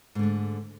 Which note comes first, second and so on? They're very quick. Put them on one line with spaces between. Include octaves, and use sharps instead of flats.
G#2 D3 A3